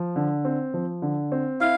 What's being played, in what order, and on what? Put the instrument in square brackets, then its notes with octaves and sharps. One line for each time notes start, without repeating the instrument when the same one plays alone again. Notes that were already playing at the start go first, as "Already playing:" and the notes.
Already playing: [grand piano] F3
D3
C4
F3
D3
C4
[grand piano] E4 [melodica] F5